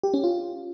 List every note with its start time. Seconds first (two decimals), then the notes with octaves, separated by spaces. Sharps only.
0.03 G4
0.14 C#4
0.24 F4